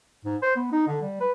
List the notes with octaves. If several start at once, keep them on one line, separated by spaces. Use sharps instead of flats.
G#2
C5
B3
D#4
D3
G3
B4